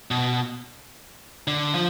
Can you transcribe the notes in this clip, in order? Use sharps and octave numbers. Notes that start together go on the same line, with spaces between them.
B2
D3
F3